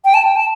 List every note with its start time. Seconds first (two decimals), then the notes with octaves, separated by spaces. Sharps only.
0.05 G5
0.14 A5
0.25 G5
0.36 A5